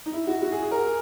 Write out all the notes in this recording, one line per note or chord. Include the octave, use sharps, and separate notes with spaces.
D#4
E4
F#4
F#4
G#4
G#4
A#4
G#4